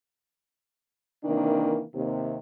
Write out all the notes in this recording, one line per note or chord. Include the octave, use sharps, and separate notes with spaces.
C3 D#3 E3 A#3 D4
D#2 C3